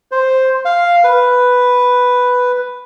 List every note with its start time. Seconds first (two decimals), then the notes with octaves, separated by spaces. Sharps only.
0.11 C5
0.65 F5
1.04 B4